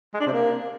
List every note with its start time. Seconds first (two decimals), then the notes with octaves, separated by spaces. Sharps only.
0.14 G#3
0.20 D4
0.27 C3
0.33 A#3